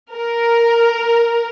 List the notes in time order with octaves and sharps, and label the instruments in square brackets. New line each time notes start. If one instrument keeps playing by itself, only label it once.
[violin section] A#4